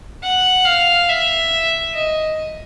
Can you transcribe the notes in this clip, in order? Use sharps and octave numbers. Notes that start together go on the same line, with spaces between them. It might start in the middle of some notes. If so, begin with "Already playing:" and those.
F#5
F5
E5
D#5